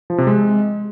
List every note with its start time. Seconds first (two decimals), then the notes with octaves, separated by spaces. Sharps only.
0.10 F3
0.18 C3
0.27 G#3